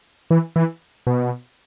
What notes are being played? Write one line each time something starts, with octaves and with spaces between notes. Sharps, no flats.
E3
E3
B2